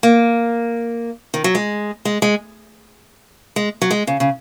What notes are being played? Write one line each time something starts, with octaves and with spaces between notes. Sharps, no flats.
A#3
D#3
F#3
G#3
G#3
G#3
G#3
F#3
G#3
C#3
C#3